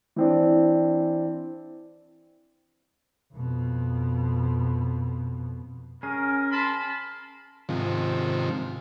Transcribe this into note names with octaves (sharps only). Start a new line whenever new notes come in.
E3 C4 D4
F2 B2
C#4 G#4 A#4
A5 B5 C6
G#2 C3 D#3 F3